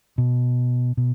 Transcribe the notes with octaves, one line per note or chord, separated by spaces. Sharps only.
B2
B2